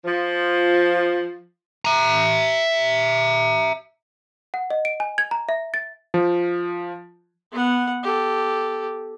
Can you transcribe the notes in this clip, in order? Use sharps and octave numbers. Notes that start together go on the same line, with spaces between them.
F3
E5 A#5
F#5
D#5
D7
G#5
G#6
A#5
E5
A6
F3
B3 F#5
G4 A4